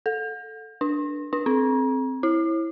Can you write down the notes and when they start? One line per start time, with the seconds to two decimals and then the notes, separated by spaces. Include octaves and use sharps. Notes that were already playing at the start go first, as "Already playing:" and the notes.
0.06 A4
0.81 D4
1.33 D4
1.46 C4
2.23 E4